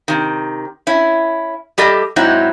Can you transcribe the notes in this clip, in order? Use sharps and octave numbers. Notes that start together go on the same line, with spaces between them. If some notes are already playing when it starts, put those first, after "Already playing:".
C3 D#3
C#4 E4
G3 G4 A4 D#5
G#2 F#3 C4 D#4 E4